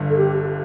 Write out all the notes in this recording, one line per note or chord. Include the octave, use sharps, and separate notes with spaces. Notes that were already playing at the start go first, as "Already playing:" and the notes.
Already playing: G1 G2 D3
A4
G4